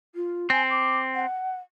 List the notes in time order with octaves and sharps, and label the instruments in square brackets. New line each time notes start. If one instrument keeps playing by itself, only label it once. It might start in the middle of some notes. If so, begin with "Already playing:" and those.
[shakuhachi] F4
[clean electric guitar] C4 [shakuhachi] G#5
[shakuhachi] D6
F#5